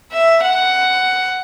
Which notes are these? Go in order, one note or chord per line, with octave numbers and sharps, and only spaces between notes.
E5
F#5